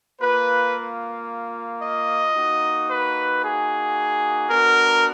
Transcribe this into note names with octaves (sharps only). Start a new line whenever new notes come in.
A#3 F4 B4
D#5
A#3 D#4 F#4
B4
G#4
B3 D4 F#4 A#4